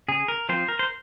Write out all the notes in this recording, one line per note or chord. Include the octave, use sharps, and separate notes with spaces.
C#3 G#4
A#4
F3 C4 F4 C5
A#4
C5